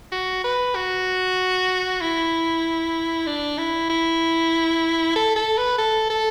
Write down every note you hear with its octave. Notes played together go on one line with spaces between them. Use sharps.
F#4
B4
F#4
E4
D4
E4
E4
A4
A4
B4
A4
A4